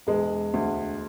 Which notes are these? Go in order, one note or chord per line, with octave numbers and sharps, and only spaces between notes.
E1 G#3
D2